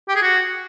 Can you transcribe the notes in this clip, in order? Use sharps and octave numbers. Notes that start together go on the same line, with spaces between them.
G4
G#4
F#4